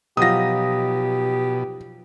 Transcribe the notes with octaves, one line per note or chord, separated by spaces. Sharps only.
B2 F3 F#3 D#4 G4 D#6 A#6